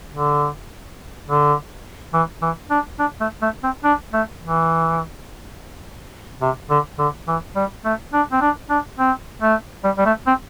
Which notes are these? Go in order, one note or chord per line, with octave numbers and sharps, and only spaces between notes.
D3
D3
E3
E3
D4
D4
A3
A3
C4
D4
A3
E3
C3
D3
D3
E3
G3
A3
D4
C4
D4
D4
C4
A3
G3
G3
A3
C4